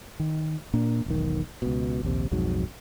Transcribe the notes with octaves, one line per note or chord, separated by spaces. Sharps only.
D#3
A#2 A#3 D4
E1 B1 D#3
C#2 B2
A#1 D#2 C3
B1 F2 G#2 F#3